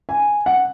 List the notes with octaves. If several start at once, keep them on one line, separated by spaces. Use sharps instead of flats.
G#5
F#5